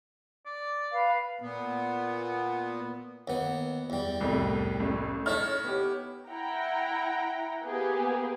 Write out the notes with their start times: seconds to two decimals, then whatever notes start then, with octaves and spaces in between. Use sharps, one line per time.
0.46 D5
0.92 B4 F5
1.41 A#2 B3
3.28 D#2 B3
3.90 E2 G3
4.21 C2 F2 A2
4.80 A1
5.26 D#4 E4 A4 C#5 E5 F6
5.64 B3 G4
6.29 E4 F#5 G5 A#5
7.63 A#3 B3 G4 G#4